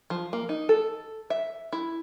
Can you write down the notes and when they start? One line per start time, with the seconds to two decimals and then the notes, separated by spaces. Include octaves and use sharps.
0.10 F3
0.33 A#3
0.49 D#4
0.69 A4
1.30 E5
1.73 E4